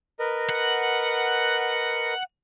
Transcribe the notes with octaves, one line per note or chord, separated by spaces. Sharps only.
A#4 B4 D#5
F#5